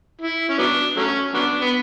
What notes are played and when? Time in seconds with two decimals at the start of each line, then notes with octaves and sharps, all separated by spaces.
0.22 E4
0.49 C#4
0.59 F#3 B3 D4
0.97 F#3 A3 C#4
1.34 F#3 B3 D4
1.62 B3